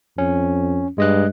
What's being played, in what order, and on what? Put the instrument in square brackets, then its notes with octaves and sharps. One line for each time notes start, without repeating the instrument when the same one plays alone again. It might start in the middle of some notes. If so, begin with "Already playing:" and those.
[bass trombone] F2 [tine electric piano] C#4
[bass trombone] G2 [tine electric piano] G#3 D#5 F#6